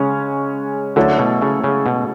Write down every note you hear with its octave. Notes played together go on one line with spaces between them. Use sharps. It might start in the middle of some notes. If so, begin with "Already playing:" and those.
Already playing: C#3 G#3 C#4 C#5
D3 F#3 A3 E4 A4 C#5
B2
C#3
C#3
B2